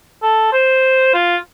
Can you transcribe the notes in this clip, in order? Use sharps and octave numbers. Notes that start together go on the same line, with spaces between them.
A4
C5
F4